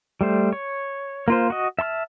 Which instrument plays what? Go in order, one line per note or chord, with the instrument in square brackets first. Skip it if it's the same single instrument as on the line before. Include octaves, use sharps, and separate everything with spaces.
[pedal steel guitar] G3 A3 C5
C#5
A#3 F4 C5
F#4 D#5
E5 A5 C6 F6